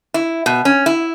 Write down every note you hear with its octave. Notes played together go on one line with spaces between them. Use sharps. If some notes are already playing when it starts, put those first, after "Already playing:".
E4
B2
C#4
E4